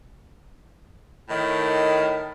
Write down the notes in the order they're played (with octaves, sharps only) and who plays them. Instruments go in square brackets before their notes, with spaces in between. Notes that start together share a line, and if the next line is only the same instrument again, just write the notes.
[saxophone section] A2 D#3